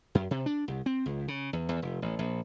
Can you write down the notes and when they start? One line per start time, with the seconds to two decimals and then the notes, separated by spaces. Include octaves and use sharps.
0.15 F#2
0.31 C3
0.46 D4
0.68 C2
0.86 C4
1.06 C#2
1.28 C#3
1.53 E2
1.69 E2
1.82 F1
2.02 A1
2.19 A#1